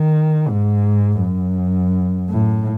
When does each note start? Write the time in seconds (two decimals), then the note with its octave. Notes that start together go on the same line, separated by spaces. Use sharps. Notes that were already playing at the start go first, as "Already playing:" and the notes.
Already playing: D#3
0.48 G#2
1.21 F#2
2.30 A2